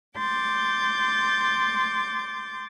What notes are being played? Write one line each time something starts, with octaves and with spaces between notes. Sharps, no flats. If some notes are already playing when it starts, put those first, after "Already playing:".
C6 D6 G6 A6